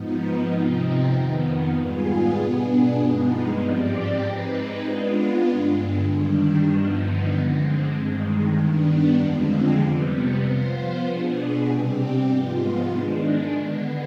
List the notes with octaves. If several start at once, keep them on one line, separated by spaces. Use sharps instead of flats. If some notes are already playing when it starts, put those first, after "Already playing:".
Already playing: G#2 F3 B3 D#4
C3 F3 C4 D#4
F2 D#3 B3
G#2 G3 B3 F4 G#4
B2 B3 D4 G#4
G2 F3 G#3 B3 D#4
G#2 F3 C4 G4 D5
G#3 C4 D#4 B4
G#3 B3 D4 F4
G2 D3 G#3
G2 D#3 G3 D4
G2 D3 F3 B3 D#4
D3 G#3 C4
G2 D#3 G#3
D#3 G3 B3 D4
F2 D3 F3 G#3 C4
C3 G3 B3
F3 B3 F4 C5
B2 B3 D4 G#4
C3 G3 C4 G4
G#2 F3 G#3 B3 F4
D#3 G#3 D4
D3 G#3 B3